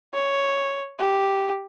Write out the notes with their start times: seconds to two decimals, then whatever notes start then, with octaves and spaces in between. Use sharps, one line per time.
0.14 C#5
0.99 G4